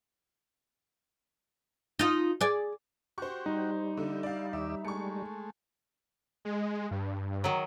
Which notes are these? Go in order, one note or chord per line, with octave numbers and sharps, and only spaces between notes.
D#4 F4
G#4 D5
F#4 G4 C5 C#6
G3 D#4
D3 E5
D5 F5
D#2 D5 E5 E6
G#3 A3 C#6 C#7
G#3
G2
D#3 F#3